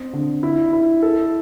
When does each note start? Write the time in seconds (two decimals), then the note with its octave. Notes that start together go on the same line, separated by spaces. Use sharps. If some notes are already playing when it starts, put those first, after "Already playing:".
Already playing: C4
0.13 D3
0.43 E4
0.73 E4
1.03 A4